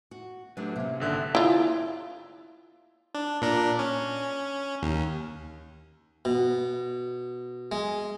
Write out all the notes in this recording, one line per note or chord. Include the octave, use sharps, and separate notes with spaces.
F#4
F#3 A3 D4 G4 B4
C3 A#3 C#4
G#1 D3 A4 E5 F#6
E4 F4
D4
A#2 D4 A#4
C#4
D#2
B2
G#3